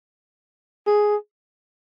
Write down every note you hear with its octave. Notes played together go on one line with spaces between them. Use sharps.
G#4